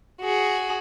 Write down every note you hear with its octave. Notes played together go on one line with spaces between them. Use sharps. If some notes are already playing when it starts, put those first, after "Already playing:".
F#4 G#4